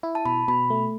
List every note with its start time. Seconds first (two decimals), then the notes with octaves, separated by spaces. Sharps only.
0.03 E4
0.15 A5
0.25 B2 B5
0.48 B2 B5
0.70 A3